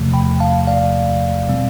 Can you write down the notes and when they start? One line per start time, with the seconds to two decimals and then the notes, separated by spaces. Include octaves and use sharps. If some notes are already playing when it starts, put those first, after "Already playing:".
Already playing: E2 C3 F3 A3
0.13 G5 B5
0.40 F5 A5
0.67 D5 F5
1.49 B2 G3 C4